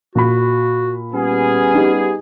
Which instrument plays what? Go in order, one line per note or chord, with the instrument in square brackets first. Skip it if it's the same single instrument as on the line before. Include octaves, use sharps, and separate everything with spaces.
[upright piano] A#2 B5 [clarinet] F#4
[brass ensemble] G3 B3 G#4 [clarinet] C#4
[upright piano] D#4 G4